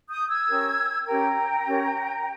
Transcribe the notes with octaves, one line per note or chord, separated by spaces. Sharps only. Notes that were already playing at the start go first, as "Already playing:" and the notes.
D#6 G6
E6 G#6
C#4 G4 A#4
C#4 G4 A#4 G5 A#5
C#4 G4 A#4